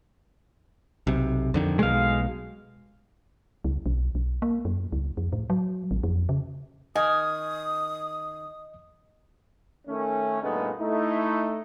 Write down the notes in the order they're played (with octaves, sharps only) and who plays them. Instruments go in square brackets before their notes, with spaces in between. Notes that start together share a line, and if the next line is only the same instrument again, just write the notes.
[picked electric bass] B1 C3
F2 D3 D#3
[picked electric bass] B1 B2 [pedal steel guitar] G#3 F5
[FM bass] C#2
B1
B1
A#3
F#2
C#2
F2
A2
F#3
A1
F2
C#3
[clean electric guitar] D#3 [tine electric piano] D#5 [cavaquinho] G#5 [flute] D#6
[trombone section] D#3 A3 C#4
G2 A#2 G#3 A3 B3 D#4
A3 D#4 E4